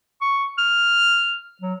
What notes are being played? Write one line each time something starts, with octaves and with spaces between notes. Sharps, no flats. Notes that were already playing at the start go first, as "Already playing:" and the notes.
C#6
F6
F#3